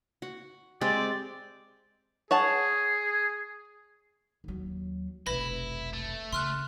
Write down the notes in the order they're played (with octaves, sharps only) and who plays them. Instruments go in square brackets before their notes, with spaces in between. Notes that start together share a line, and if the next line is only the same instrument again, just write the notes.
[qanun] F#4
[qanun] G#3 C4 G4 [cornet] D5
[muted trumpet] G#4 [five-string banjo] C#5 F#5 A5
[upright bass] D#2 F#3
[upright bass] F1 B1 [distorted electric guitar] E4 [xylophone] B4 B5 A#6
[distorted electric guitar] A3
[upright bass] C#3 [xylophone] C6 F6 F#6